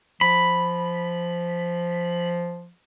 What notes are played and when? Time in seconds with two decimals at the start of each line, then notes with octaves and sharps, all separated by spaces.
0.21 F3 B5